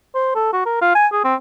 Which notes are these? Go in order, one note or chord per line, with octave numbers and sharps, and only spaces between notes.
C5
A4
F#4
A#4
F4
G#5
G#4
C4